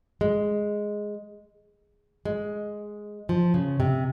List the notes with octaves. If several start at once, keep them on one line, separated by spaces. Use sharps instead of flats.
G#3
G#3
F3
C#3
C3